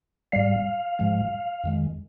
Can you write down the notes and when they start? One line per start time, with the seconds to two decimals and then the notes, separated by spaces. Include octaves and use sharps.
0.32 G#2 G3 F5
0.99 G#2 F3 G#3
1.64 F2 D#3 G#3